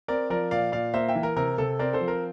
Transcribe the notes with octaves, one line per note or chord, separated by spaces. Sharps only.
C4 A#4 D5
F3 A#4 D5
A#2 D5 F5
A#2 D5 F5
A#3 C5 E5
E5 G5
E3
A#4
C3 A#4
C3 A4
C4 A#4 D5
A4 C5
F3
A#4